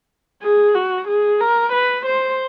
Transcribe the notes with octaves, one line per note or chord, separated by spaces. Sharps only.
G#4
F#4
G#4
A#4
B4
C5